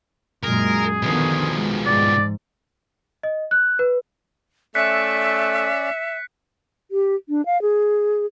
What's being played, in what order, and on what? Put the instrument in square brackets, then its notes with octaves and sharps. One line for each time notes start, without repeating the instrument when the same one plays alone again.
[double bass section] F#2 A#2 G#3 [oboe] G#4 [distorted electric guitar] A#4
[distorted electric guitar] B2 F3 [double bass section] D3 D#3 B3
[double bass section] G#3
[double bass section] G#2 [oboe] D5
[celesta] D#5
F#6
B4
[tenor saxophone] A3 [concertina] C#4 D5 [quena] E5 [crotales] F#6 B6 C#7
[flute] G4
D4
F5
G#4